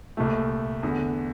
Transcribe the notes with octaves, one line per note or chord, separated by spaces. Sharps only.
C2 A#2 A3
E2 D3